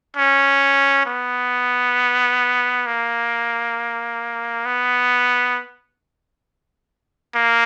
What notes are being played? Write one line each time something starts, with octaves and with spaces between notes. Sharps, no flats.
C#4
B3
A#3
B3
A#3